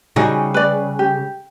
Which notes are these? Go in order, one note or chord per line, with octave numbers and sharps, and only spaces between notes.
C#3 G3 D#4 F#4 G#5
B4 D5
G4